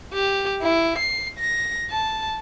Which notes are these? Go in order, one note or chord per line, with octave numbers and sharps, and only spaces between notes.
G4
E4
C7
A#6
A5